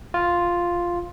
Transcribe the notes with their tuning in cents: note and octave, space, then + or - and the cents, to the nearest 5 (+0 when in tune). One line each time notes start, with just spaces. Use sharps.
F4 +0